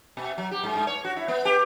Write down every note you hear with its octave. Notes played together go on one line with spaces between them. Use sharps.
B2
F#3
G4
G#2
G#2
C#5
F#4
E4
B3
G4